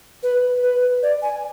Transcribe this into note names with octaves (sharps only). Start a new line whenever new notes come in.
B4
B4
D5
G#5